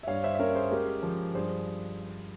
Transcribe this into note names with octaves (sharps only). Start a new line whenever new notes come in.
E5
G2 C#5 F5
C5 E5
E5
C#4 A#4 C#5
G#4 C5
G#3 G4 A#4
F3
G2 G#4 C5